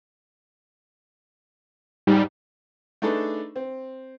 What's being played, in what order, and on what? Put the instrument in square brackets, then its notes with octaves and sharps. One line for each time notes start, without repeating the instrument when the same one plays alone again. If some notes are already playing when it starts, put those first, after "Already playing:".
[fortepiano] G#2 [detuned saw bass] G3
[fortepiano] A3 D4 D#4 G#4 A4 B4
C4